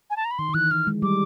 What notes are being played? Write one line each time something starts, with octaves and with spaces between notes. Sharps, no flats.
G#5
A5
A#5
B5
D#3 C6
D#3
E3 F#6
E3 F6
G#3
G3 D6